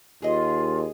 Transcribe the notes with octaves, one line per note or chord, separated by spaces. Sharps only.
D#2 F4 G#4 D#5